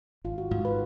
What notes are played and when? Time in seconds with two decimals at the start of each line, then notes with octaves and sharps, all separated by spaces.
0.24 G#1 F4
0.38 F#4
0.51 G#2 F4
0.65 B4